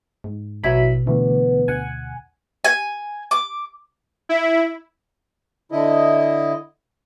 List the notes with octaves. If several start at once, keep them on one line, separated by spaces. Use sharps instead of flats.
G#2
A1 B2 F#3 E4 B5 G#6
D2 E3 B3
D2 F#5 G#5
G#5
D6
E4
D3 E4 D#5